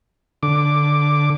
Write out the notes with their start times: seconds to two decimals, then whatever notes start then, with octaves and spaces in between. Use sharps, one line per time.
0.43 D3 D6